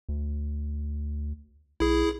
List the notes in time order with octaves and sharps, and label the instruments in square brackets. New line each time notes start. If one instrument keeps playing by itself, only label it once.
[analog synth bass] D2
[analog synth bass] B1 [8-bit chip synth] E4 G#4